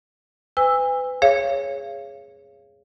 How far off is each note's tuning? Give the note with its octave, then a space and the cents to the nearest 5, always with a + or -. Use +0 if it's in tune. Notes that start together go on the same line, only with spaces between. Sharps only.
B4 +35 G#5 -40 E6 +0
G#4 +0 C#5 +0 F5 -30